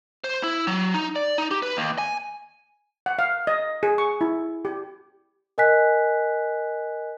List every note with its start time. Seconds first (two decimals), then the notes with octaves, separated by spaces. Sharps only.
0.24 C5
0.43 E4
0.67 F#3
0.94 D#4
1.16 D5
1.38 D#4
1.51 G4
1.63 B4
1.77 D#2
1.98 G#5
3.06 F#5
3.19 F5
3.47 D#5
3.83 G#4
3.98 C#6
4.21 E4
4.65 G4
5.58 A#4 D#5 G#5 F#6 B6